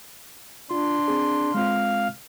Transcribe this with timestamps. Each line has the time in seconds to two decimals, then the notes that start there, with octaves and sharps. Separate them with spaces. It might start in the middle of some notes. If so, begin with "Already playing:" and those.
0.71 D4 F4 C6
1.08 C4 G#4
1.55 G#3 C4 F4 F5